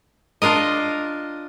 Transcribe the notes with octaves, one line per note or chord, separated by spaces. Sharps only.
D4 F4 A#4 D#5